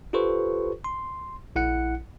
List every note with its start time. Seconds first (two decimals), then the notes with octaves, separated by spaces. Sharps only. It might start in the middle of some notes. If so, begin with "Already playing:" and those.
0.13 F4 G4 A4 B4 C5 C#6
0.84 C6
1.56 A#1 E4 F#5 F#6 C#7